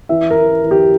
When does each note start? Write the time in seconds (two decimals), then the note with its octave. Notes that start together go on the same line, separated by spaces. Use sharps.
0.09 E3 E5
0.31 A#4
0.37 E3
0.64 E3
0.71 G4